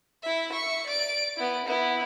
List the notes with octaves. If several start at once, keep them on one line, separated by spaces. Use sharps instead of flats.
E4 E5
E5 C#6
D5 D7
B3 E4
B3 E4